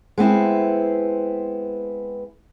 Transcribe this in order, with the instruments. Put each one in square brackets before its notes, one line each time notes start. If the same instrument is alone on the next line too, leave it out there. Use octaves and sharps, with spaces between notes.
[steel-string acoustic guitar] G#3 B3 C4 E4